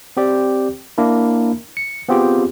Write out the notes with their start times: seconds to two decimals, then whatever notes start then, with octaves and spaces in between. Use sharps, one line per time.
0.17 C4 G4 D5
0.98 A#3 D4 E4
1.77 C#7
2.09 B3 C4 F4 G4 G#4